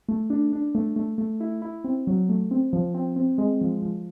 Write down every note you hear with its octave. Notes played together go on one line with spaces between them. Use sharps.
A3
D4
D4
A3
A3
A3
E4
E4
C4
F#3
A3
C4
F3
C4
C4
G#3
F3
F3